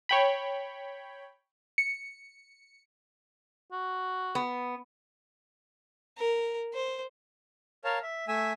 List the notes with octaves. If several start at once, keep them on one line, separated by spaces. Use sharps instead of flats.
C#5 G5 B5
C#7
F#4
B3
A#4
C5
A#4 C#5 F5 A5
E5
A3 E5 G#5 E6